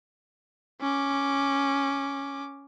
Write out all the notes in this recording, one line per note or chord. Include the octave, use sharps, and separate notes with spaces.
C#4 D6